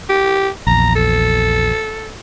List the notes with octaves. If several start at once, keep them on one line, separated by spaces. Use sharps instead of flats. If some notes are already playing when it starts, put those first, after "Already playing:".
G4
A#1 E2 A#5
A4